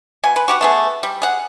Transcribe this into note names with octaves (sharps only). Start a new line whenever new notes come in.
B2 G#5
B4
F#4 G4 F#5
A3 B3 G#4
G3
G#4 F#5